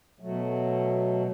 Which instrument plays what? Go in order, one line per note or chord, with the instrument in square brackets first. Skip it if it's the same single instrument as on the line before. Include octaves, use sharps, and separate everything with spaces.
[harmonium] B2 F#3 A3